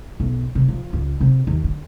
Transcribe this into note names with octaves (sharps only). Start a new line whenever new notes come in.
B1
C3
F3
C#2
C3
D#2
D3